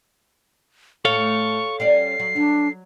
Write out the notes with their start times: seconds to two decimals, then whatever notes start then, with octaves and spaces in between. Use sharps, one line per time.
1.05 A2 A3 A4 C#5 F5 C#6
1.80 G3 C#4 D5 C7
2.20 F#3
2.36 F#3 D4